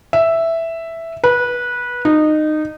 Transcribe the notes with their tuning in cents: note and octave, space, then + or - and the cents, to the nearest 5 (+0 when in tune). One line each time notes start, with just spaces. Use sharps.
E5 +0
B4 -20
D#4 -20